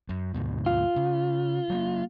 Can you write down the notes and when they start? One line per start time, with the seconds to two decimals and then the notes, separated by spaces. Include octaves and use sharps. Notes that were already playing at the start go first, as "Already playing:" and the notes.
0.09 F#2
0.34 D2 G#2 B2
0.66 F4
0.96 C#3
1.70 F#3 G#3 A#3